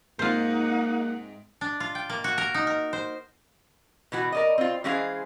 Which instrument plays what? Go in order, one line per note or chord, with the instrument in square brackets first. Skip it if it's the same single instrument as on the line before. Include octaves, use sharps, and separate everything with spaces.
[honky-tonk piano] G#2 C3 [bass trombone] A#3 [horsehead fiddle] D#4 F#5 [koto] F4 C5
[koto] D4
F4
G5
A#3
F#4
A#4
D#4
A#4
C5
[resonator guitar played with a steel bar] B2 E3 F#4
A#4 D5 D#5
C4 F4
E3 G#3 C#4 G#4 C5 F5